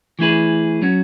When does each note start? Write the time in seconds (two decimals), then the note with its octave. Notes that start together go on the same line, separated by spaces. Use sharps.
0.19 E3 A3 E4 G#4 B4
0.82 F#3 C#4 F#4